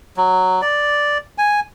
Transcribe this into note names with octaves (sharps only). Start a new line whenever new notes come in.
F#3
D5
G#5